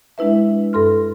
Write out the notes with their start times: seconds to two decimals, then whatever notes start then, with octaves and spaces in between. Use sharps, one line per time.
0.18 G#3 D4 E4 B4 E5
0.73 G2 A4 C6 F6